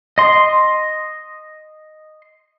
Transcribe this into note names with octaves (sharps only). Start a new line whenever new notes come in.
D#5 C6